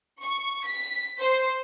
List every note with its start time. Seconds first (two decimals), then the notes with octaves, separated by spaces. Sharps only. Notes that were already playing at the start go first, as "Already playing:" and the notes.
0.22 C#6
0.66 B6
1.20 C5